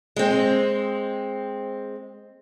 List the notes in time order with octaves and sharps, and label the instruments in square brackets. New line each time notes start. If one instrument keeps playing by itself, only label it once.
[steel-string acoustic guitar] G#3 C4